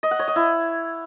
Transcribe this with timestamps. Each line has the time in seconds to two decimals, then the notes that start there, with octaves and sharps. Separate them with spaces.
0.03 D#5
0.11 F#5
0.19 C#5
0.28 D#5
0.36 E4